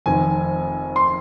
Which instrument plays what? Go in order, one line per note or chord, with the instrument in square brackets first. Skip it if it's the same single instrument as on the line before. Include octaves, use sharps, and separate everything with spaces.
[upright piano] F1 F2 D#3 [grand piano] G#5
[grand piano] C6